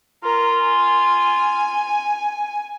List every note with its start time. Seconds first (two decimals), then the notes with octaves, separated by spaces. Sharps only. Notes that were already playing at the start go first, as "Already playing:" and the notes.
0.24 F4 A#4
0.64 G#5